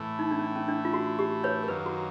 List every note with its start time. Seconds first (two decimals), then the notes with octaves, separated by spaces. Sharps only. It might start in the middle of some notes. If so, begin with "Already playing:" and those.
Already playing: A2 E3 A3
0.19 D#4
0.31 D4
0.39 C#4
0.44 D4
0.56 C#4
0.69 D4
0.85 F4
0.93 F#4
1.19 G4
1.44 B4 C#5
1.63 A#4
1.68 F#2 D#3 F#3 A#3 B4
1.86 F#4